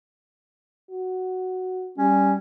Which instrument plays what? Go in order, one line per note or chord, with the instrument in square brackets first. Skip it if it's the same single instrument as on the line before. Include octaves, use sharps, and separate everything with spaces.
[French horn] F#4
[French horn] G3 [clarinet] C#4